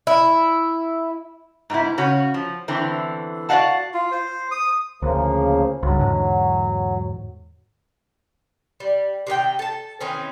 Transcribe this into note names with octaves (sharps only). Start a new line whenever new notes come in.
E4
G#2 B2 C4 E4
C#3 C#4 F#4 C#5
F3
E2 D3 E3 C4
F#4 D5 D#5 F5 F#5 A5
F4
C5
D#6
D2 C#3 F3 A#3
C#2 G2 F#3
E2 G#2 D3
G3
C3 D#3 F4 G5
A4 A5
D#3 E3 C4 C#4